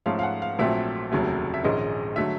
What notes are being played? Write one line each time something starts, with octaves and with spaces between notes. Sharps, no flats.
G#2 F3 A3 C#4 F5
F5
F#5
F5
A#1 A#2 F#3 A3 C4 E5
F1 D#2 C#3 F#3 A3
E5
A#1 G#2 D#3 G#3 C#4 D#5
D3 F#3 A3 E5